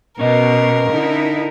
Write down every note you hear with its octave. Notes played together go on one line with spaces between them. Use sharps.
B2 C#4 A#4 D#5
D3 D#4 E4